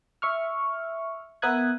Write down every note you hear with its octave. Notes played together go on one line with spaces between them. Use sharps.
E5 C#6 F6
B3 A#4 E5 D#6 F#6 G#6